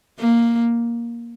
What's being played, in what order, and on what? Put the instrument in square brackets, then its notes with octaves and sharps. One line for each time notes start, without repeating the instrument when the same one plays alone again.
[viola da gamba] A#3